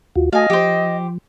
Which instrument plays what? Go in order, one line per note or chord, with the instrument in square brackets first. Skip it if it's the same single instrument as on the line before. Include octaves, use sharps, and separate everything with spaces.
[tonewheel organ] D#2 F4 F#4
[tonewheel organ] A3 F#4 A5 [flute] D#5 [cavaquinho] F5 G#5
[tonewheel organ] F3 [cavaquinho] G4 C5